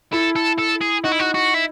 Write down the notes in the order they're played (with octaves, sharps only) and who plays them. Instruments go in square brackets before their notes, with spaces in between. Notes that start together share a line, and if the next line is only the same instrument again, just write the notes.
[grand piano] E4 [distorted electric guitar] A4
[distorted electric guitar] A4
A4
G#4
[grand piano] D#4 [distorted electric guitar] F#4
[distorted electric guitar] E4
F#4
F#4
E4